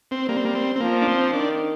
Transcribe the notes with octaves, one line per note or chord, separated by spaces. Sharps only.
C4
G3 A#3
C4
A#3
C4
C4
F3 A#3
D4
C4
D#3 D4